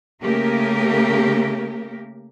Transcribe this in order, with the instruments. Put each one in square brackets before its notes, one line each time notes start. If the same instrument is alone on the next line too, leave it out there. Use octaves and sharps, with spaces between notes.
[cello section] C#3 A3 A#3 G4 A#4